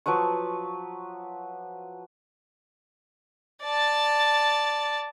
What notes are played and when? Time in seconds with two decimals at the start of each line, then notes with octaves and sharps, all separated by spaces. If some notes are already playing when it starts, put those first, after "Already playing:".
0.06 F3 F#3 B4 C#6
3.64 D5 A5